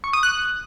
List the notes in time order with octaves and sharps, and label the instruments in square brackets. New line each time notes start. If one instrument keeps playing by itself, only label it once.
[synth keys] C#6
D#6
F#6